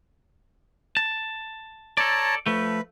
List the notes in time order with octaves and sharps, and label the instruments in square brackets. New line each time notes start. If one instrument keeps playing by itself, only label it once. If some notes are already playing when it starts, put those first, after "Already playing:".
[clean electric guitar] A5
[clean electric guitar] A4 D5 [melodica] C#5 A5 A#5
[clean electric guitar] F3 A3 [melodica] B4